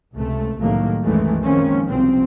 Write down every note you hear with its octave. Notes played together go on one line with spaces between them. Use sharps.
C#2 C3 A3
C2 A2 D#3 F#3 A3 A#3
C2 F#2 D#3 E3 G#3 A3
D#3 F3 G#3 A#3 C4 C#4
C2 F#2 B2 F3 C4